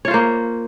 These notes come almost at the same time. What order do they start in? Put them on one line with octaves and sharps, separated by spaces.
C#5 F4 C5 A#3